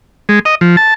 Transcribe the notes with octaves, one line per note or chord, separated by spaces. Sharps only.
G#3
D#5
F3
A5